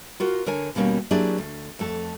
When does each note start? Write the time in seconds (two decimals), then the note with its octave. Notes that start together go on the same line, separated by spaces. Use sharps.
0.20 F4 F#4 A#4
0.46 D3 A#4 C#5 G#5
0.75 D#2 B2 G3 A#3 C#4
1.11 F#3 A#3 D4 E4 G4 G#4
1.38 D2
1.79 F2 A3 A4